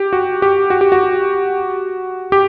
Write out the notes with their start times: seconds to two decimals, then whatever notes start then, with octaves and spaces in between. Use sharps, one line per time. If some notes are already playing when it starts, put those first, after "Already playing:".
Already playing: G4
0.13 F#4
0.42 G4
0.70 F#4
0.81 G4
0.92 F#4
2.32 G4